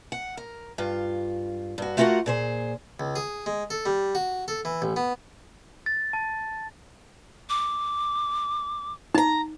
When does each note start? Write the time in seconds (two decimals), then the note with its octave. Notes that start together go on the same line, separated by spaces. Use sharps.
0.12 F#5
0.37 A#4
0.78 G2 F4
1.78 G2 F#4
1.97 A3 F4 F#4 A4 A#4 F#5
2.26 A#2 G#4 C5
3.00 C#2
3.16 G#4
3.46 G#3
3.70 A4
3.86 G3
4.15 F#4
4.48 A4
4.65 E3
4.82 A1
4.96 B3
5.86 A6
6.13 A5
7.50 D6
9.14 D#4 A5 A#5